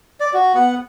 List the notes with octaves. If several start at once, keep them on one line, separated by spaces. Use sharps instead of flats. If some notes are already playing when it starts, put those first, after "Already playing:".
D5
F#4
B3 F#5